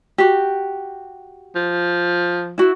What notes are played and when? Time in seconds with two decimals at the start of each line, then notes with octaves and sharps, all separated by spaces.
0.18 F#4 G4
1.56 F3
2.58 E4 F#4